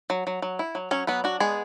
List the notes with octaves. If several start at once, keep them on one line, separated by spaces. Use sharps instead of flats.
F#3
F#3
F#3
E4
F#3
F#3 C#4 C#5
F#3 B3 B4
D4 F#4
G#3 B3 G#4